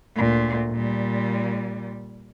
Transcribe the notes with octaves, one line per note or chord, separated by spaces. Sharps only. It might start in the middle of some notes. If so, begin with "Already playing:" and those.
D2 A#2
A#2 G3